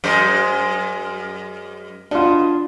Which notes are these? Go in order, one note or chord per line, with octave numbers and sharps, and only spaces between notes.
F#2 G#3 C5
B2 D4 F4